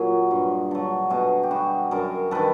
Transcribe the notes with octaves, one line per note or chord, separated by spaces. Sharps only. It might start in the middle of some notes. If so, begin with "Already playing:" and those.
Already playing: A#2 F#3 F#4 G#4
G2
D3 F#3
B2 F#4 G#4
G4
G3 F#4 G#4
F#2 G#4 A#4
D#3 G3 A4 B4